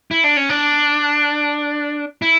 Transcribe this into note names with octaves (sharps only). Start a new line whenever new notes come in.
E4
D4
C#4
D4
E4